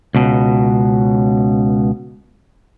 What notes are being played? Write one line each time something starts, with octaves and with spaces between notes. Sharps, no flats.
C#2 B2